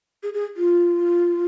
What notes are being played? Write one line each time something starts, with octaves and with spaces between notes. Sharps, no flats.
G#4
G#4
F4